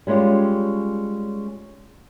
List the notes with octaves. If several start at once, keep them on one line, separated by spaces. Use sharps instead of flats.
G3 G#3 C#4 F4 G4